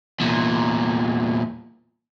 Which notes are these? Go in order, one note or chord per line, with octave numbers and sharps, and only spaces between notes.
E2 A#2